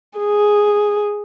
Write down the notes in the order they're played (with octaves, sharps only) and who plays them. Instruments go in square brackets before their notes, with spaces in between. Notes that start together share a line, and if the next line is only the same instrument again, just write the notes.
[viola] G#4